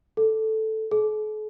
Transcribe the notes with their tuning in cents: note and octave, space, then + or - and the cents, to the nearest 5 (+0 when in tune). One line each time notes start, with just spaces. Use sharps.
A4 +0
A4 -45